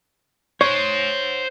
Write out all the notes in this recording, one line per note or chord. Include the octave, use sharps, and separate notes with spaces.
C5 C#5 F#5